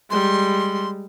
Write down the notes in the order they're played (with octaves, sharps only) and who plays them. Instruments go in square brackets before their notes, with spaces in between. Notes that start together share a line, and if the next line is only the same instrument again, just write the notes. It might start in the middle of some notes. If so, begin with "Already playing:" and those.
[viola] G3 G#3 [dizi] C6